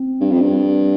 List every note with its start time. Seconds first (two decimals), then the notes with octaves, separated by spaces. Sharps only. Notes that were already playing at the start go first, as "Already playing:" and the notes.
Already playing: C4
0.21 G2
0.32 F2
0.41 G2